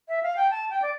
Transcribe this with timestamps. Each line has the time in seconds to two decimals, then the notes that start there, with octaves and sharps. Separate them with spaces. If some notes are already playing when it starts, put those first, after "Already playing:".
0.08 E5
0.23 F5
0.36 G5
0.50 A5
0.70 G5
0.82 D5